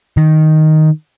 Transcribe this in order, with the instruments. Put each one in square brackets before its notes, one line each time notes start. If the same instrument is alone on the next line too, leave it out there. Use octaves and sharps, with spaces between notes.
[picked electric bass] D#3